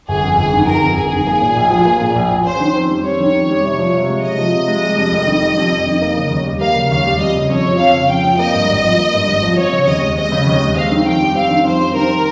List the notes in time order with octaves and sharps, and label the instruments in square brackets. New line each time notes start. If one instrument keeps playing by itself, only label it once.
[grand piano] G1 [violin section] G#4
[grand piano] F2
[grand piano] G1 [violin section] G#4
[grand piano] D#3
[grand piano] G1 [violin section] A#4
[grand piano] F2
[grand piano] G1 [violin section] G#4
[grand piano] D#3
A#3
A#2
A#1
F3
A#3
A#2
A#1
F3
[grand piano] C#4 [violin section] C5
[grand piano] D#3
F2
G3
[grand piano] C#4 [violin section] C#5
[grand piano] D#3
F2
G3
C3
F3
C3
G#3
[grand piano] C3 [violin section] D#5
[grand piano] F3
C3
G#3
G3
F2
F1
D#3
G3
F2
F1
D#3
A#3
C#3
D#2
G3
[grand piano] A#3 [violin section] F5
[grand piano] C#3
[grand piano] D#2 [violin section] F5
[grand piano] G3
[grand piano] F2 [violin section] D#5
[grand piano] C#3
[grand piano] F2 [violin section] C#5
[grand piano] F3
[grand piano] F2 [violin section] F5
[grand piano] C#3
[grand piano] F2 [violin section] G5
[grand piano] F3
[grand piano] A#3 [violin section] D#5
[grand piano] G2
G#1
F3
A#3
G2
G#1
F3
[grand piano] C4 [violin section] C#5
[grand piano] C#3
[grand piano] D#2 [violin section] D#5
[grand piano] G#3
[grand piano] C4 [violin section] D#5
[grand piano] C#3
D#2
G#3
[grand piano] C4 [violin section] F5
[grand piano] D#3
[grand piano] F2 [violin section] G5
[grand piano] G3
[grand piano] C4 [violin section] F5
[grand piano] D#3
[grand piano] F2 [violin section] C5
[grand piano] G3
[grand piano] D#3 [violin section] A#4